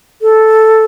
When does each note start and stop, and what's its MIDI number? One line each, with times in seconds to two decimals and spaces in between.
0.22 0.85 69